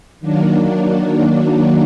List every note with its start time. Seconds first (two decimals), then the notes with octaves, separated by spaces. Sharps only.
0.20 D#3 F#3 A#3 D4